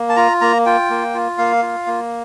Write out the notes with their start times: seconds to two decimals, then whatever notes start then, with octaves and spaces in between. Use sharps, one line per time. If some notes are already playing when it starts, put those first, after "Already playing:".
Already playing: A#3
0.09 A5
0.16 F4 A#5
0.41 A#3 A#5
0.66 F4 G5
0.90 A#3
1.14 F4
1.38 A#3 F5
1.62 F4
1.87 A#3